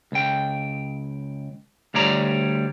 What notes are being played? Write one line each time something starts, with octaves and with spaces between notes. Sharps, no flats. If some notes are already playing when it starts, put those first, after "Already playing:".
C#2 G5
D2 G3 C#5 D5 A#5